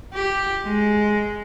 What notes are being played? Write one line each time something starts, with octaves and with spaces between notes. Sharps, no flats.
G4
G#3